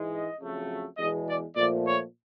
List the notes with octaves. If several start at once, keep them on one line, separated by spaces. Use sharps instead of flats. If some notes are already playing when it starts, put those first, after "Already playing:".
Already playing: G#2 E3 G#3
D#5
F2 C#3 F#3 A3
E2 B2 G#3 D#5
D5
A#2 F3 A3 D5
C#5